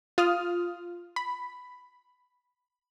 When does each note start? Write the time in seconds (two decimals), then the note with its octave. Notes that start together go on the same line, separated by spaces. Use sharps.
0.18 F4 D#6 F6
1.16 B5